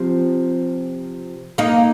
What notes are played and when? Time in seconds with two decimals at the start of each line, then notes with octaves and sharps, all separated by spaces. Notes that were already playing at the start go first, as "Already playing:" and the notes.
Already playing: C3 F3
1.58 A#3 D#4